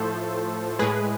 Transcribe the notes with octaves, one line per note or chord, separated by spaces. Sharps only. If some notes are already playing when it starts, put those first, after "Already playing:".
Already playing: A2 F3 A3 A4 C5
A2 G#3 G#4 B4